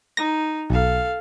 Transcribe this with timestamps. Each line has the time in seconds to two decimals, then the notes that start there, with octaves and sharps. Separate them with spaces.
0.17 D#4 A#6
0.70 B1 A4 F5